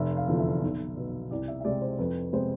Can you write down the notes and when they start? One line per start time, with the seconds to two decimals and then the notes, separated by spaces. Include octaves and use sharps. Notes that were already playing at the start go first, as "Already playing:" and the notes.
Already playing: F1 E5
0.17 F5
0.28 E2 D3 F3
0.40 E5
0.62 B1
0.97 B2 B3
1.31 C2 D5
1.48 E5
1.60 E5
1.65 C3 G#3 D5
1.82 C5
1.99 F2 B4
2.33 C3 G#3 B3 C5